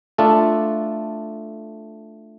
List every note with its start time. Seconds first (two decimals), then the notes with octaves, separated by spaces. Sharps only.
0.18 A3 D4 F4 A4